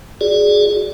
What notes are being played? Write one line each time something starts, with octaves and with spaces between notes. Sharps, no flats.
F#4 G#4 D5